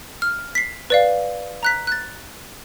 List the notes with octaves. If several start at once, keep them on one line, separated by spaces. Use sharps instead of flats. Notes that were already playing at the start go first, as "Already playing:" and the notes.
F6
B6 C7
B4 D5 F5
A#5 F#6 B6
F#6 A6